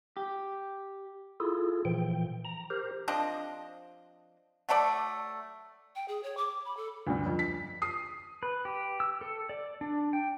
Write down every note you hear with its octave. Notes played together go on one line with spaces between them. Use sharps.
G4
E4 F4 G#4 A4
A#2 E3 F3 G5
A#5
G4 A#4 C5
F3 C4 D4 D#5
F#3 A3 A4 D5
G5
G#4
C#5
D6
B5
A4
D2 G2
F2
B6
D#6 C7
B4
G4
E6
A4
D5
D4
G5